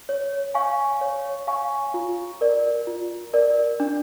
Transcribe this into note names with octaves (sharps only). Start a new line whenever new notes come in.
C#5
F5 G#5 C#6
C#5
F5 G#5 C#6
F4
A#4 D5
F4
A#4 D5
D4